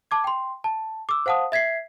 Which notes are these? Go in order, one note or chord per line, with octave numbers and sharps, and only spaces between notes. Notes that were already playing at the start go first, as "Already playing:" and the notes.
A5 D6 G#6
G5 C6
A5
D6 E6
C5 F5 F#5 A5 D#6
E5 G#6 B6 C7